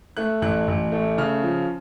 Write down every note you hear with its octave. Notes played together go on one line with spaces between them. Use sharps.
A3 F#6
A1 F#6
A1
A3
C#3 F6
F3